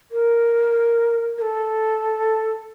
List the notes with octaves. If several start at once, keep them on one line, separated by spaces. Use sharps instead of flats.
A#4
A#4
A4